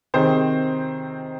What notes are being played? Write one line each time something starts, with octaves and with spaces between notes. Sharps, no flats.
C3 D#3 C4 G#4 C5